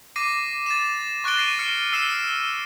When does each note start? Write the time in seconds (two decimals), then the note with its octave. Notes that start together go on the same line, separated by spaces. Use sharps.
0.16 D6 A#6 C7 D#7
0.66 A6 D#7 E7
1.24 C#6 F#6 A6 D7 G7
1.37 A#6 C7 D#7
1.59 F6 C#7
1.93 E6 F6 C7 E7